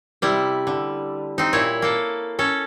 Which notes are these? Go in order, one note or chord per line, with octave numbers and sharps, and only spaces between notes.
C3 G3 E4
D3
C4 D#4
A#2 E4 C#5
A#3 A4
C#4 A4